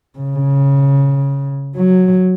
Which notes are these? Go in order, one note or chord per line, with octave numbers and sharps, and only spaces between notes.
C#3
F#3